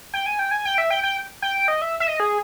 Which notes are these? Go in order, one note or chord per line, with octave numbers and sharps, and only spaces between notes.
G5
G#5
G5
G#5
G5
E5
G5
G5
G5
D#5
E5
E5
D#5
G#4